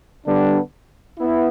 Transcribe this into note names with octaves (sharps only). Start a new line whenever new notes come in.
D3 G3 B3 D4
B3 E4